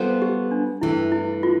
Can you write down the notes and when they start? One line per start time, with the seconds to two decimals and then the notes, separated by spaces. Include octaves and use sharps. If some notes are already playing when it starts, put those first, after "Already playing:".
Already playing: G3 B3 F4 A4 C5
0.22 G4
0.51 D4
0.81 G2 E3 A3 E4
1.12 E4
1.43 F4